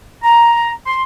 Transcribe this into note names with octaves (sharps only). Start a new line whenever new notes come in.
A#5
C6